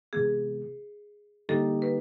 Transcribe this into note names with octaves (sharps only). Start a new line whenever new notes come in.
C3 E3 G#3 B3 G#4
D3 G3 A#3 D#4 G4 A4
B4